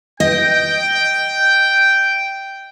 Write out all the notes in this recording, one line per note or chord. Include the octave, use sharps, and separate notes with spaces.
D#5 G5